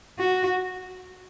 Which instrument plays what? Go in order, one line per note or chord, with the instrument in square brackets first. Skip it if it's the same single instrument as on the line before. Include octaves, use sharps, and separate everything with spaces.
[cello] F#4